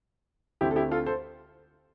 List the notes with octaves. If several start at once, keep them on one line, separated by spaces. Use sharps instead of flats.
D2 D3 A3 C4 E4 G4
A4
E4 G4
F4 A4
A4 C5